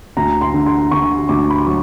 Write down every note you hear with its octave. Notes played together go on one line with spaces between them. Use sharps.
D2 A#5
C6
D3
C6
D3 C#6
D2 D6
B5
C6
F#3 C#6